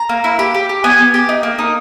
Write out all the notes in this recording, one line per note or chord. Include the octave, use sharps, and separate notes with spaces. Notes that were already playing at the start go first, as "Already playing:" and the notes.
Already playing: A#5
A#3
E4
G4
G4
G4
B3 G#5
B3
G4
D#4
A#3
D#4